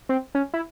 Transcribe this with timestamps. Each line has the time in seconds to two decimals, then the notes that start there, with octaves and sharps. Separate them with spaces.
0.09 C4
0.35 C#4
0.54 E4